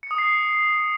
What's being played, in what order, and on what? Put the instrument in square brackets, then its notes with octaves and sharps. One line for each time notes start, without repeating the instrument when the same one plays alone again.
[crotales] C#7
D#6
C7